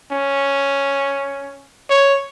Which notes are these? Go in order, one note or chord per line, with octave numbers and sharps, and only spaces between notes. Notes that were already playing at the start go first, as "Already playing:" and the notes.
C#4
C#5